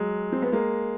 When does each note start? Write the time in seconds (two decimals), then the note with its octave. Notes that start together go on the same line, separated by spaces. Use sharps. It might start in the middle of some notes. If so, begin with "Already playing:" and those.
Already playing: F#3 G#3
0.32 C4
0.42 B3
0.52 G#3 A#3